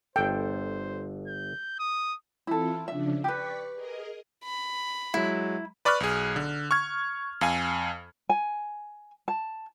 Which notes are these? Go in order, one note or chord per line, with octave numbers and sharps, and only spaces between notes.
G1 A4 C5 G5
G6
D#6
E3 C4 E4 F4 A4
C#3 F3 D4 E5
G4 B4 D5 C#6 B6
G#4 A#4 D#5
B5
F#3 G#3 E4
B4 D5 B5 C#6 F6 F#6
B1 G#4
D3
C#6 F6 G#6
F2 F5 G#5
G#5
A5